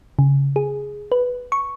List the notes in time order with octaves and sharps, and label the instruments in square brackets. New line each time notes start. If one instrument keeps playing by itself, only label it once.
[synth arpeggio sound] C#3
G#4
B4
C#6